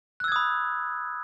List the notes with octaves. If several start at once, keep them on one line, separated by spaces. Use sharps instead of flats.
B5 D#6 E6 F#6 G#6